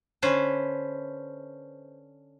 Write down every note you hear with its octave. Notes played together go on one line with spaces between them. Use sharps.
D3 C#4 B4 C5